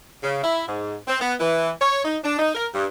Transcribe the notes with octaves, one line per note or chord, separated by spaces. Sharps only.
C#3
E4
G#2
C4
B3
E3
C#5
D#4
D4
D#4
A#4
G2